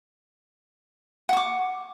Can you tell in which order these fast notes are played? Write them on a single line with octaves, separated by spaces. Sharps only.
F#5 C#6 D6